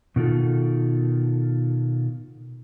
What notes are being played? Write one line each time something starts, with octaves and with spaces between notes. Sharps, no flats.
B2 D#3 F4 A4